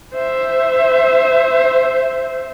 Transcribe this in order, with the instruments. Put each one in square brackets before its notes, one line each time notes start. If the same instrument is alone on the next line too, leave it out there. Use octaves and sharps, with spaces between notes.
[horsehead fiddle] C5 E5